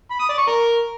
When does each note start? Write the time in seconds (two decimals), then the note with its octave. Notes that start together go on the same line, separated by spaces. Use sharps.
0.11 B5
0.20 D#6
0.29 D5
0.38 C#6
0.47 A#4